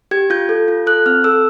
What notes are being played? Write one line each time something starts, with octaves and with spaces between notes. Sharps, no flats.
G4 G#6
F4 G6
A4
F4
A4 F#6
C4 F6
A4 E6